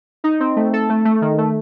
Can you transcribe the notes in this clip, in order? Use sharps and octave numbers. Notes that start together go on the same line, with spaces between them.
D#4
C4
A3
A4
A3
A3
D#3
A3